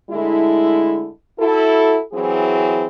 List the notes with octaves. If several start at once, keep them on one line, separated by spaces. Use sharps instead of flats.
D3 G#3 A3 E4
E4 F#4 A4
E3 F#3 C4 E4 G#4